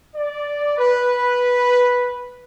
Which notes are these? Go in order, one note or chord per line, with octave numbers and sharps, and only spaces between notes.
D5
B4